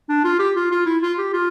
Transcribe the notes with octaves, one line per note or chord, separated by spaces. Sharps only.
D4
F4
G4
F4
F4
E4
F4
G4
F4